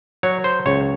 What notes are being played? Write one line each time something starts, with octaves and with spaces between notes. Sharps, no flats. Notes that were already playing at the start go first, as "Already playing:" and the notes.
F#3 C#5
C5
C#2 C#5